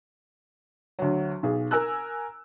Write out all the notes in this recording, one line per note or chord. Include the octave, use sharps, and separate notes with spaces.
D2 F#3
B1 G#4
A#4 G#5 E6 F#6